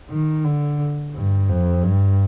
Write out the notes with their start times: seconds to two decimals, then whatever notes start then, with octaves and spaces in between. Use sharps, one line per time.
0.10 D#3
0.44 D3
1.14 G2
1.49 F2
1.83 G2